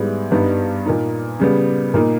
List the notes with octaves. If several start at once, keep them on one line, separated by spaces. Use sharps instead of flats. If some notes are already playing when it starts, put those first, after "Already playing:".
Already playing: G#2 G3 B3 E4
G2 G3 B3 D#4
A#2 A#3 D#4
C#3 G3 B3
A#2 A#3 D#4